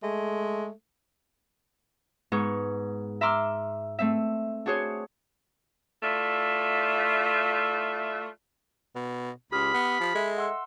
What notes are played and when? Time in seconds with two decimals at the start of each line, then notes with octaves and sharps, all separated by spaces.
0.03 G#3 A3
2.32 G#2 B3 G#4 C#6
3.21 E5 A#5 C6 D6 E6 F6
3.99 A3 C4 E5
4.66 D4 F#4 G#4 C5 C#5
6.03 A3 E4 F4 D5 E5
8.95 B2
9.52 C#2 G4 B5 D#6 F6
9.74 B3
10.00 F3
10.15 G#3 A4 D#5 E5
10.38 F#5 C6 E6